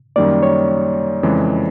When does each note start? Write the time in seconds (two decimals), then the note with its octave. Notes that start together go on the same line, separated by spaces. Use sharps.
0.16 F#2 D#3 G3 A#3 D5
0.43 C#5
1.23 F2 C#3 E3 G#3